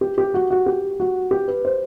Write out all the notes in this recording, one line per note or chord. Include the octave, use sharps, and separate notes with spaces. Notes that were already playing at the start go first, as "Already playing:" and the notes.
G4
G4
F#4
F#4
G4
F#4
G4
B4
C5